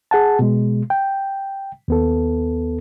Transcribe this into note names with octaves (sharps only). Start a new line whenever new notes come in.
G#4 F#5 A5
B2 G#3
G5
D#2 B3 A4